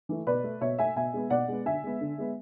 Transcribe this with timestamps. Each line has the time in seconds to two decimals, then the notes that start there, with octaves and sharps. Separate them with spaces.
0.09 E3 A3
0.27 B2 B4 D5
0.44 A3
0.61 B2 C#5 E5
0.78 A3 E5 G#5
0.96 B2 E5 G#5
1.14 G#3 B3
1.30 B2 D5 F#5
1.48 G#3 B3
1.65 D3 E5 G#5
1.84 G#3 B3
2.01 D3
2.18 G#3 B3